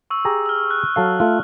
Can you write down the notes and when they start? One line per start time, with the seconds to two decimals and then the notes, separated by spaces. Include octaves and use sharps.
0.10 C#6 E6
0.25 G4 G#4 A#5
0.46 E6 F6
0.71 F#6
0.96 F#3 A4 F5
1.20 A3 F4